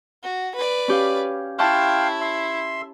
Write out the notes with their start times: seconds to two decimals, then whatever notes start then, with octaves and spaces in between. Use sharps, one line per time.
0.23 F#4
0.55 B4 D5
0.88 C#4 G4 F5
1.59 E4 F5 G5 A5 C6 C#6 F#6
2.21 E5 C6